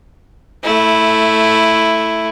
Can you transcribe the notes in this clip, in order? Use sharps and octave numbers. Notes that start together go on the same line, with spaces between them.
A3 E4